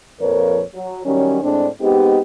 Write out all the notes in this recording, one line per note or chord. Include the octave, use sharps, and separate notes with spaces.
F2 A#2 F3 A#4 B4 C#5
F#3
D#3 F#3 G3 C#4
A2 G#3 C4 D4
G#3 B3 C4 D#4 G4